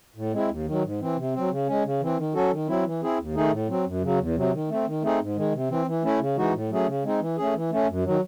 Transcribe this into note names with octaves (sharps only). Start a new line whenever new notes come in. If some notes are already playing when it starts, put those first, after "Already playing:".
A2
G#3 C4 E4
D#2
D#3 F#3
G#2
E3 C4
C3
F#3 C4
C#3
G#3 C#4
C#3
E3 C4
D#3
F#3 C#4 F#4 A4
D#3
F#3 C4 E4
E3
C4 E4 G#4
D#2
D#3 A3 D#4 G#4
A2
F#3 C4
F#2
C#3 F#3
E2
C3 F#3
D#3
A3 C4
D#3
A3 C4 D#4 G#4
G#2
D#3 G#3
C3
E3 C4
E3
A3 C#4 E4
C#3
E3 G#3 D#4 F#4
A2
F#3 A3 C#4 G#4
C#3
G#3 C4 D#4
E3
A3 C#4 G#4
E3
A3 C#4
F#2
D#3 F#3